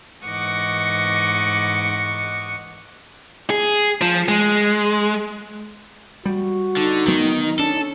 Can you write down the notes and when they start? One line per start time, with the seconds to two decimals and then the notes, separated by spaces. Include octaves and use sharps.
0.25 G#2 E3 D#5 F#5 C#6 D6
3.50 G#4
4.02 F3
4.28 G#3
6.26 G3 F#4
6.77 D3 D#4
7.07 D2 D#3 F#3 B3
7.59 C#4 D4 A4